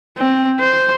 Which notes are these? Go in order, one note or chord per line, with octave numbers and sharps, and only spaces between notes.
C4
C5